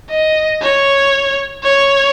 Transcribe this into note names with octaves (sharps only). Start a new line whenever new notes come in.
D#5
C#5
C#5